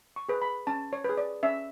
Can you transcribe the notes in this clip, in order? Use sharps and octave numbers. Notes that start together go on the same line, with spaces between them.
C#6
G#4 B4
B5
C#4 A5
C#5
G#4 B4
D5
C#4 E5